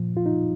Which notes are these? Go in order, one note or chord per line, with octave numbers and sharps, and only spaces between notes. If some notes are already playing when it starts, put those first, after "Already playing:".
Already playing: A#2 F3
F4
D#4